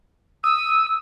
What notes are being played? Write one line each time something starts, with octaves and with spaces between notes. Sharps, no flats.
D#6 E6